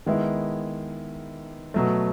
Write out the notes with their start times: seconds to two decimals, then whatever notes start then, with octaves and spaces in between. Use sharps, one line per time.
0.06 D#3 G#3 B3 E4
1.74 B2 F#3 A3